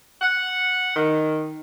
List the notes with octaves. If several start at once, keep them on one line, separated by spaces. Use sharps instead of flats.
F#5
D#3